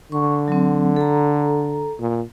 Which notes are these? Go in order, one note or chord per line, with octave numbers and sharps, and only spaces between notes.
D3 C#6
F#3 C4
A4 A#5
A#2